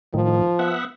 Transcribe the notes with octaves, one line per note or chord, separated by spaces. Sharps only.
A2 D#3 F3
B3 E5 F#5